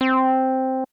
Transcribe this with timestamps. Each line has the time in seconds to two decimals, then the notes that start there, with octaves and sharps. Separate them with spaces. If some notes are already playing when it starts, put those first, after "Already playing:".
0.01 C4